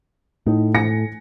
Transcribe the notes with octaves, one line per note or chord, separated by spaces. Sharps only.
A2 D#4
G#5 A#6 C#7